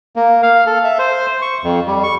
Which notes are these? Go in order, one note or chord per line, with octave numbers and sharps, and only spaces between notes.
A#3
F5
A4
E5
C5
C#6
F2
G3
C#6